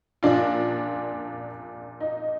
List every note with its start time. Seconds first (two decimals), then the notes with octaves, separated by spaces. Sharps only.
0.23 A#1 A#2 D4 F4
2.00 D#4